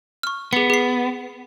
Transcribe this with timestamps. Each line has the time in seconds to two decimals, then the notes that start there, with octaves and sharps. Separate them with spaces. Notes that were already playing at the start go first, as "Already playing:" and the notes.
0.23 C#6 F6
0.53 B3 G#4 C#7
0.70 G#4 C7